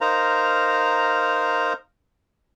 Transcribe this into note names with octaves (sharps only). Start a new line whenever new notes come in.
D#4 A#4 C5 F5 A#5